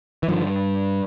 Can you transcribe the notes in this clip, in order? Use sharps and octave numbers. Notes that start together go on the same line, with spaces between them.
E3
G2 D3 D#3 F3